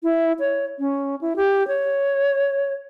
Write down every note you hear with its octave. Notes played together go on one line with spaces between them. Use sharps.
E4
C#5
C#4
E4
G4
C#5